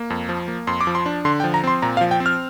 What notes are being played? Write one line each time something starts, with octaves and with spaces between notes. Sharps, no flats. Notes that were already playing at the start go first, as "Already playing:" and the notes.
Already playing: A#3
F2
F3
A#3
F2 C6
D6
F3
C6
D4
D3 C6
G5
F3
A#5
C4 C6
A#2 A#5
F5
F3
G5
C4
F6